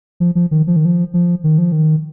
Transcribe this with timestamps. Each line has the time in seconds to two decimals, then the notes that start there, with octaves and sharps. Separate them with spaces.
0.20 F3
0.35 F3
0.51 D#3
0.67 F3
0.76 D#3
0.85 F3
1.14 F3
1.44 D#3
1.58 F3
1.72 D#3